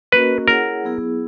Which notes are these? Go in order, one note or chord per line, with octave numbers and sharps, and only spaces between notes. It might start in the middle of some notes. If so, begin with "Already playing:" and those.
A#3 C#4 F#4 A#4 B4 D#5
E4 G#4 A#4 C#5 F#5
F#3 B3 E4 G#4